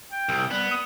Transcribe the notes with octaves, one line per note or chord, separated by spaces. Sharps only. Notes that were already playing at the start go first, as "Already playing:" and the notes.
G5
C2
G3 B3
D#6